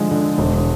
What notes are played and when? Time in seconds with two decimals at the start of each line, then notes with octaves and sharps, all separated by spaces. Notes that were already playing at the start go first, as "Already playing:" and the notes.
Already playing: D3 F3 G#3
0.11 D3
0.38 E1